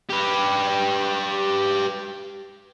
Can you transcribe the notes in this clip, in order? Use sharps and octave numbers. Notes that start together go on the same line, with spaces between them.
G4 B4